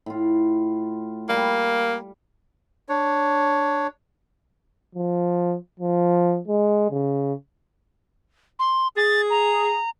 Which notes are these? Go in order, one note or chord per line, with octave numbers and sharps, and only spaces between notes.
A2 F4
G3 A#3
D4 C#5
F3
F3
G#3
C#3
C6
G#4 A6
A#5